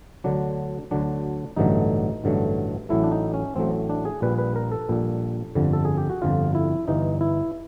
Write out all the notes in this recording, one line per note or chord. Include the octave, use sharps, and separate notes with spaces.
D2 D3 F#3 D4
D2 D3 F#3 D4
A1 G2 D3 F#3 A3 D#4
A1 G2 D3 F#3 A3
A1 A2 F#3 A3 E4
D4
D#4
C#4
A1 A2 F#3 A3 C4
D4
G#4
A#1 A#2 G3 B4
B4
A#4
A4
A#1 A#2 G3
G1 F2 D3 G3
A4
G#4
G4
F#4
G1 F2 D3 G3 F4
E4
G1 G2 E3 D#4
E4